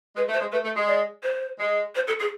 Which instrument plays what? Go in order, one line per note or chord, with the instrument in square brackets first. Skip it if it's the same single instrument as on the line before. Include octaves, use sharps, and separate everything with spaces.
[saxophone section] G#3 [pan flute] B4
[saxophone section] A3
[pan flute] C5
[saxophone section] G#3
[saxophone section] A3 [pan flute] B4
[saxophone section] A3
G#3
[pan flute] D5
C5
[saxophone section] G#3
[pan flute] C5
A4
G#4